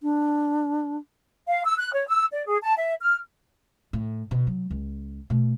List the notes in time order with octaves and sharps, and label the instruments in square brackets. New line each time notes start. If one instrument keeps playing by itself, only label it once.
[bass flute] D4
[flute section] F5
E6
F#6
C#5
E6
D5
G#4
A5
E5
F6
[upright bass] A2
B2 D3
F#3
C#2
B2 A3